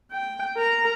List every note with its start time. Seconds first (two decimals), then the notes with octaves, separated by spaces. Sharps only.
0.12 G5
0.57 A#4 A#5